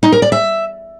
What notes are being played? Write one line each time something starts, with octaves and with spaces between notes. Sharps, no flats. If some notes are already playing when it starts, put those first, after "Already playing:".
D#4
A#4
D5
E5